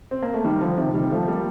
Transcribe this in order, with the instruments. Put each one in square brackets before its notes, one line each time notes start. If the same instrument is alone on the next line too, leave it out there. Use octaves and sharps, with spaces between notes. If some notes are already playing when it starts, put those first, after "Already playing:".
[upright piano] C4
A#3
A3
D#3 G3
D3 F3
C3 D#3
D#3 G3
F3 A3
A3
G3 A#3